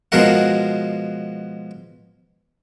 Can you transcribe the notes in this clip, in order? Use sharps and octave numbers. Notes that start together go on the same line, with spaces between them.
B2 F3 G#3 F#4 A#4 F#5